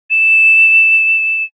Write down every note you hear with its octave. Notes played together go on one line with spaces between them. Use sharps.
E7